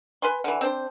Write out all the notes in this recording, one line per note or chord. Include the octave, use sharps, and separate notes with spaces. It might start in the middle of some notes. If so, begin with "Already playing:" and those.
B4 G#5 C6
D3 E3
C4 D4 C5